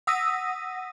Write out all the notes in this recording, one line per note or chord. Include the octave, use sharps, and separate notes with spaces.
F#5 D#6 E6 A#6 B6 D#7